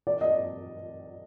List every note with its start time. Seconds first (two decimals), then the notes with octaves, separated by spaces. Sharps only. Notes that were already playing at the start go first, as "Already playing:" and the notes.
0.07 D5
0.21 D#5